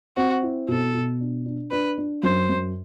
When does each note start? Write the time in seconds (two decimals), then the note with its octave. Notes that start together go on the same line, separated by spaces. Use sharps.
0.17 C4 F#4
0.43 E4
0.68 B2 A4
0.94 B2
1.21 D4
1.46 D4
1.71 D4 B4
1.98 D4
2.23 F#2 C5
2.49 F#2